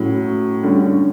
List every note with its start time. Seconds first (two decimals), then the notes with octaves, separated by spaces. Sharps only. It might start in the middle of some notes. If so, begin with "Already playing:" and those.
Already playing: A2 F#3 C#4
0.63 D3 G3 C#4